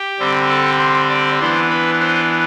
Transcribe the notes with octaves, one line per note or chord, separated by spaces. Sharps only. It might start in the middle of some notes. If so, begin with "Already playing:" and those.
Already playing: G4
D3 G3 C4
A4
C5
D5
E3 B3 D4 C5
B4
C5